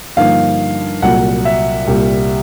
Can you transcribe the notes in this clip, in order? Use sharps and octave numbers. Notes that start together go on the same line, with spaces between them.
G2 D3 F3 A#3 D#4 F5
C2 A#2 F#3 F#5
E5
C2 A#2 G3